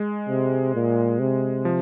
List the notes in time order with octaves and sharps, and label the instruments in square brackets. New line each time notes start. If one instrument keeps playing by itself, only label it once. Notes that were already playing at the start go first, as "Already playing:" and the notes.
Already playing: [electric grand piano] G#3
[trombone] C3
A#2
C3
[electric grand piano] F3